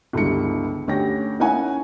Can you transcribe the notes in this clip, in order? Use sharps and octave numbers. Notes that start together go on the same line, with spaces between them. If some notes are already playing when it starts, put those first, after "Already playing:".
G1 C#2 G3 E4 C#7
D2 C#4 G4 G5 A#6
A#3 C#4 D#4 E4 F#5 G#5